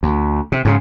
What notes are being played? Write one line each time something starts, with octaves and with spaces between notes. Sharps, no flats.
D2
C3
G#2 C#3